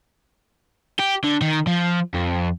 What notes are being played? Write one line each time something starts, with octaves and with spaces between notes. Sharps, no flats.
G4
D3
D#3
F3
F2